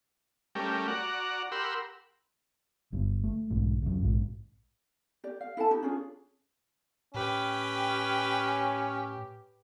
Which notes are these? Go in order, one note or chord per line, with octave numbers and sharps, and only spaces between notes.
G3 A3 C#4 G4 A#4
F#4 D5 F#5 A#5
G4 A#4 F#5 B5 C6 E6
G1 G2
A3
B1 G#2
C#2 F#2
A#1 G#2
G4 D5
F5
E4 A4 G5 A5
D#4 G4
C#4 D4 F4 G#4
A2 C#4 G4 B4 G5